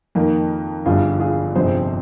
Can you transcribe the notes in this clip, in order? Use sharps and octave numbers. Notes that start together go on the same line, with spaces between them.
F2 D#3 A#3
G1 G2 D3 G3 F4 G#4
F4 G#4
G1 F2 C3 F3 G#4 C5